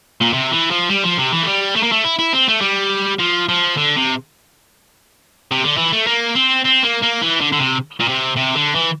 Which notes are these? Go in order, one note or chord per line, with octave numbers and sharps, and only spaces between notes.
A#2
C3
E3
F3
G3
F3
C3
E3
A3
G3
A3
A#3
A3
E4
E4
C4
A3
G3
F3
F3
D3
C3
C3
D3
E3
A3
A#3
C4
C4
A#3
A#3
E3
D3
D3
C3
A#2
C3
C3
D3
E3